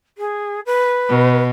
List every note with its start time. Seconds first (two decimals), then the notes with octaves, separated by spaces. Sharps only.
0.18 G#4
0.66 B4
1.09 B2